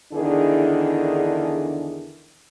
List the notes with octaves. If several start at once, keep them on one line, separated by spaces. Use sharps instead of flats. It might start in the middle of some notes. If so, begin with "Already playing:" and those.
E2 D3 D#3 D4 E4 G#4